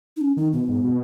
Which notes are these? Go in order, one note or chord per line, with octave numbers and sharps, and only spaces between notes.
D#4
C#4
D#3 D#4
B2 B3
G#2
B2